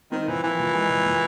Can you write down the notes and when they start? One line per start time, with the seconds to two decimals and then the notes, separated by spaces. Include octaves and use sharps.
0.12 D#3 C4
0.27 A#2 E3
0.43 E3 F3
0.59 A#2
0.74 G#3
0.89 A#2
1.05 A#2